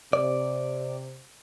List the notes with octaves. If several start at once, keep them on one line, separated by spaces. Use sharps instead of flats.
C3 D5